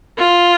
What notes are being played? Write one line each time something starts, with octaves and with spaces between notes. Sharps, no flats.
F4